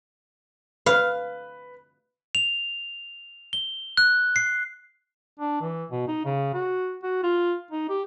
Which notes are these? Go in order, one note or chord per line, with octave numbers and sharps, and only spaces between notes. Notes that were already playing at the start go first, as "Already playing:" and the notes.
B4 F5
F7
G7
F#6
C7
D4
E3
B2
D#4
C#3
F#4
F#4
F4
D#4
G4